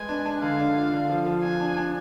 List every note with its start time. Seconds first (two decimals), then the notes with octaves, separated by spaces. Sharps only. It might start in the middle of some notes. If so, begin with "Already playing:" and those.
Already playing: G#3 B4 G#5
0.09 D4
0.26 D4
0.42 D3 F5
0.59 D4
0.76 F4
0.93 D3
1.09 F3
1.26 F3
1.43 D4 G#5
1.60 D4
1.77 D4